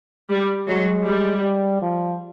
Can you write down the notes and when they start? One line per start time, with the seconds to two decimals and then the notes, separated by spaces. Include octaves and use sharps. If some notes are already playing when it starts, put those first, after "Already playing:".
0.30 G3
0.68 F#3 G#3
1.06 G3
1.44 G3
1.82 F3